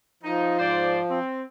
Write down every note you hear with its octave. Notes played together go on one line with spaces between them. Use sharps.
F3 D#4
G#2 C5 D5
C4